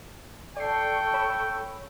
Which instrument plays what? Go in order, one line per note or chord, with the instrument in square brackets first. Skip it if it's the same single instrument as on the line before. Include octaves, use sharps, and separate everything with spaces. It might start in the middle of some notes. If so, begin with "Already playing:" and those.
[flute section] A4 C#6 [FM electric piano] D5 C7 [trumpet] G5
[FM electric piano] C#5 B5 E6